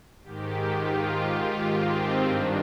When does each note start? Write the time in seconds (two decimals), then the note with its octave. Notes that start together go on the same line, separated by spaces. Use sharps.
0.23 G#2 D#3 G4
0.73 F4
1.73 C4
2.23 G2 D#3 D4